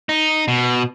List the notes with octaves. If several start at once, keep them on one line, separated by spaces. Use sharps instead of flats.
D#4
B2